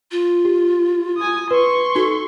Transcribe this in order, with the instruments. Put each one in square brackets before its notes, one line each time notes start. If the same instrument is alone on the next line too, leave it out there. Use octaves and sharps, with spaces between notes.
[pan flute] F4
[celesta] G4
[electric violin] G#5 D#6
[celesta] B4 [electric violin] C6 C#6
[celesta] D#4 F#4 G7 [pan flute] A4